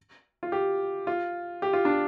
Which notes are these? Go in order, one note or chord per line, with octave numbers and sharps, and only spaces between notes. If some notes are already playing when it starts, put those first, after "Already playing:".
F4
G4
F4
G4
F4
D4